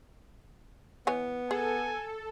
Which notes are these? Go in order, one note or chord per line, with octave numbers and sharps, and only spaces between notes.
E3 B3 C#5 G#5
G#4 A4 G#5